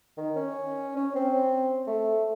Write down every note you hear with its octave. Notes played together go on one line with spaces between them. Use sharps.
D#3
C#4
C#4
C4
A3